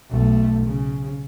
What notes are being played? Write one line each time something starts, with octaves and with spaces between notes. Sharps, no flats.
B1 A3
C#3